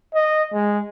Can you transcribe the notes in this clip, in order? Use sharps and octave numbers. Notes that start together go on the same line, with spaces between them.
D#5
G#3